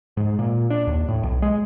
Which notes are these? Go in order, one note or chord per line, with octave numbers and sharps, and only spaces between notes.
G#2
A#2
D4
D#2
A2
B1
G#3